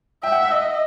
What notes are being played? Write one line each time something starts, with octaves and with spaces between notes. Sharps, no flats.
E5 G5
F#5
F#5
D#5 E5